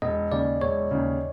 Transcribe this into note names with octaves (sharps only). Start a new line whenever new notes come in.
E1 D#5
D#2 C#3 D5
E1 C#5
D#2 C#3